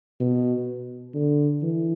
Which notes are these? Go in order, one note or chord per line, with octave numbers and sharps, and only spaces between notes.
B2
D3
E3